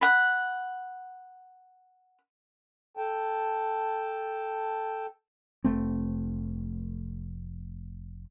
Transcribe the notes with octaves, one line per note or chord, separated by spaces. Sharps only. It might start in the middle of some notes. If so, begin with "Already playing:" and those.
F#5 B5
A4 G5 A5
F1 A3 C4